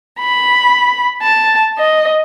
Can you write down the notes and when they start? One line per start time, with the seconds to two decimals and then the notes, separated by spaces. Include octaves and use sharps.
0.20 B5
1.22 A5
1.79 D#5